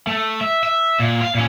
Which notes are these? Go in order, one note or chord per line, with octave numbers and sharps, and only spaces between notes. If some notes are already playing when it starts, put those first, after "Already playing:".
A3
E5
E5
A#2
F5
A#2 C#4